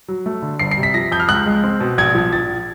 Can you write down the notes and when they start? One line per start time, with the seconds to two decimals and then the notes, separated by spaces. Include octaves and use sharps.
0.08 F#3
0.26 A3
0.42 D3
0.59 G1 C7
0.71 C7
0.77 C3
0.83 B6
0.94 F3 A#6
1.12 F2 G6
1.20 F6
1.29 C#2 F#6
1.46 G#3
1.64 C4
1.80 B2
1.98 A#1 G#6
2.15 F3
2.32 A#1 A6